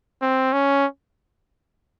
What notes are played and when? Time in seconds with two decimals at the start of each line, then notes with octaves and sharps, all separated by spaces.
0.22 C4
0.53 C#4